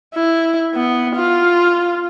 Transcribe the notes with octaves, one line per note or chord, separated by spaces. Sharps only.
E4
B3
F4